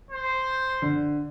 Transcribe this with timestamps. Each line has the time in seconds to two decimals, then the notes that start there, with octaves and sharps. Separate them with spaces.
0.11 C5
0.82 D3